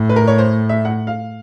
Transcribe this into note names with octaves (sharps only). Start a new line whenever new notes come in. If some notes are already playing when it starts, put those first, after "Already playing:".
Already playing: A2
B4
A#4
C#5
C5
E5
F#5
F5